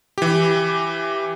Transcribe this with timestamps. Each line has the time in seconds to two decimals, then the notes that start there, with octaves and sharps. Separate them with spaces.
0.18 E3 G4